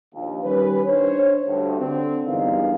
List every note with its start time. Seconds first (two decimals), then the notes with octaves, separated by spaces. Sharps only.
0.15 A#1 D#2 F5
0.43 D#3 G3 C#4 B4
0.85 D4 D#4 C5 C#5
1.47 D2 G2
1.80 D3 C4
2.27 E2 G2 G#3 D#4 A#4 F5